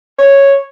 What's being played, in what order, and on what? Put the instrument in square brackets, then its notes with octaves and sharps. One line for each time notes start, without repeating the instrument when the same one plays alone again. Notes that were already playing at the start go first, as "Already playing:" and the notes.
[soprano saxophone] C#5